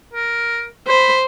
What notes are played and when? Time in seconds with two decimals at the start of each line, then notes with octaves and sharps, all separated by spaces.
0.13 A#4
0.87 C5 B5